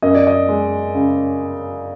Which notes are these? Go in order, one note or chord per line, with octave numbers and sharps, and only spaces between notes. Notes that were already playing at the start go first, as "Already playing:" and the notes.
F#2 D#5
D5
D#5
G#3
C#3